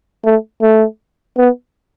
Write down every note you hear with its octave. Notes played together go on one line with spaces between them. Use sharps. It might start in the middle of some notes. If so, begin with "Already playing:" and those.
A3
A3
B3